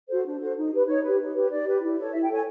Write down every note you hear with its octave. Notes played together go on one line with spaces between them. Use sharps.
F#4 A4 C5
D4
F#4 A4 C5
D#4
G4 B4
D#4 C#5
G4 B4
D#4
G4 B4
D#4 D5
G4 B4
E4
A4 C#5
E4 E5
G5
A4 C#5 G#5